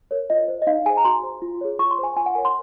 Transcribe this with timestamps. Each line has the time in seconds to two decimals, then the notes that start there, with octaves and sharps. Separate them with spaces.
0.11 A#4 C#5
0.30 F4 D#5
0.48 C5
0.62 D#5
0.67 D#4 F5
0.86 G#4 G#5
0.89 C5
0.97 A#5
1.05 F#4 C6
1.23 C5
1.42 F4
1.61 G#4 C#5
1.79 F4 C#6
1.91 C6
1.98 C5
2.03 G#5
2.16 F4 G#5
2.26 F#5
2.35 A#4 C#5 G#5
2.45 C6